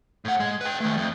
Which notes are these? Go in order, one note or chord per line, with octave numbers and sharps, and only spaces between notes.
A2 F#5
G#3
B4 G5
D#3 A3
F2